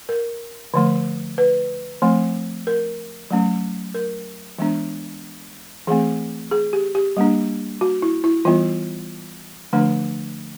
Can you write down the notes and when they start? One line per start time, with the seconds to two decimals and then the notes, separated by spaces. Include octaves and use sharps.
0.09 A#4
0.74 D3 F3 A3
1.38 B4
2.02 F3 A3 C4
2.67 A#4
3.30 F#3 A3 C#4
3.94 A#4
4.59 E3 G#3 B3 D4
5.87 E3 A3 C4 G#4
6.51 G#4
6.73 G4
6.95 G4
7.17 G3 A#3 D4
7.81 F#4
8.02 E4
8.24 E4
8.45 E3 G3 B3 F4
9.73 D3 F3 A3 D4